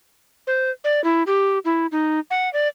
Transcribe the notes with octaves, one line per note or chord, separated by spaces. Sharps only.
C5
D5
E4
G4
E4
D#4
F#5
D5